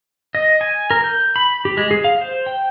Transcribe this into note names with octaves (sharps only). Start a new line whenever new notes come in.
D#5
G#5
A#4
G6
B5
G4
G#3
G#4
F5
C5
G5